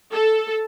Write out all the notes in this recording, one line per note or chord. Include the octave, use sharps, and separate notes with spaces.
A4